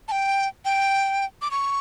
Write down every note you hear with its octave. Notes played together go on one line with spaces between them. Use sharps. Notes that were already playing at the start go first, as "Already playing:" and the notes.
A5
G5
G5
D6
C#6